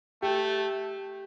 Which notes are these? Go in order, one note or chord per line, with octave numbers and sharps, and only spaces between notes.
A3 G4